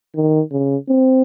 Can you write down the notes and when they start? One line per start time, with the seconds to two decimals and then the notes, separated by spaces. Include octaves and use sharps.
0.16 D#3
0.51 C#3
0.89 C4